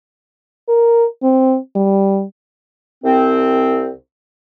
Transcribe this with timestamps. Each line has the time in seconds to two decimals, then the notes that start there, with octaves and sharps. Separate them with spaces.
0.69 A#4
1.23 C4
1.76 G3
3.04 C2 C4